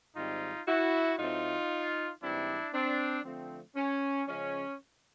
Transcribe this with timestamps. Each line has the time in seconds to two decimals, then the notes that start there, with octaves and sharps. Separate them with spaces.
0.16 G#2 D#3 G3 C4 D#4 F4
0.67 E4 F#4
1.19 A2 F#3 A3 C4 D#4 F4
2.22 G#2 E3 G3 C4 D4 E4
2.73 C4 D4
3.25 D3 F3 A3 C4
3.76 C#4
4.28 C#3 F3 G#3 C#4